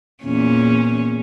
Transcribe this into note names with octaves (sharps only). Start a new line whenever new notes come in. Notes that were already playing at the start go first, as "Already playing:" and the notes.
E2 A#2 C#4